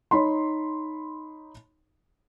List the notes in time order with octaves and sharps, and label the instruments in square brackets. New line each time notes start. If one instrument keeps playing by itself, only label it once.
[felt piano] D#4 C#5 B5 C6